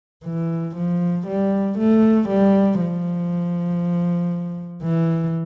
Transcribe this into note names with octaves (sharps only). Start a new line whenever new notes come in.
E3
F3
G3
A3
G3
F3
E3